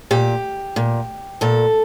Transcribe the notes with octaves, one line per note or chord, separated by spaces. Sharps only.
A#2 G4
A#2
A#2 A4